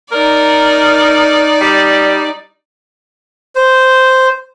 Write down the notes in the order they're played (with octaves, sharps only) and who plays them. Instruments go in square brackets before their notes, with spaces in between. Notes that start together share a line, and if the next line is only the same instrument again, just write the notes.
[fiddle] D#4 D5 [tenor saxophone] A#4
[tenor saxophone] G3
[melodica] C5